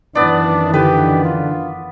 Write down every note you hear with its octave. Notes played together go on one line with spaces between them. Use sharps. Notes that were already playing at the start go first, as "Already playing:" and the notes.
F#2 D#3 E3 B3 D4 D5
D3 G4 B4
F4